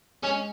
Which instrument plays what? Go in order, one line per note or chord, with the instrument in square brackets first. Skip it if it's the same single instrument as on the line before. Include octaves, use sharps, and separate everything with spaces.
[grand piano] G#3 [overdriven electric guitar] C#4